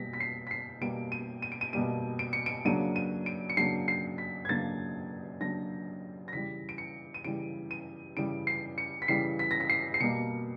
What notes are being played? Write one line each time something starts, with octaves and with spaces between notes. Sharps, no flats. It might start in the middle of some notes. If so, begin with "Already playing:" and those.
Already playing: B2 G3 A#3 A#6 B6
B6
C7
B6
C7
B2 G3 A#3 D7
D#7
D#7
D7
D#7
B2 G3 A#3 D#7
D7
C#7
D7
C#3 F#3 A#3 D4 D#7
D#7
D7
C#7
C#3 F#3 A#3 D4 C7
C7
B6
G#6
C#3 F#3 A#3 D4 A6
C#3 F#3 A#3 D4 A#6
A#6
C#3 E3 G3 B6
D7
C#7
D#7
C#3 E3 G3 D7
D#7
C#3 E3 G3 D7
C7
C#7
B6
C#3 E3 G3 C7
B6
A#6
B6
C7
C7
B2 G3 A#3 C#7